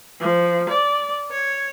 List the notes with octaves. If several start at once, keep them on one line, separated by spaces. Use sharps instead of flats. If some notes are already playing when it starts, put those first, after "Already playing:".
F3
D5
C#5